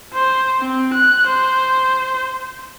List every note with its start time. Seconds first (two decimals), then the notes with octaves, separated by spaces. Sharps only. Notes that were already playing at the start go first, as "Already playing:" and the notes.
0.13 C5
0.60 C4
0.94 F#6
1.27 C5